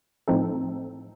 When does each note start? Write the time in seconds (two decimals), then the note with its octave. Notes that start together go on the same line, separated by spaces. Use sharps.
0.28 A2 F3 C4 D#4 A4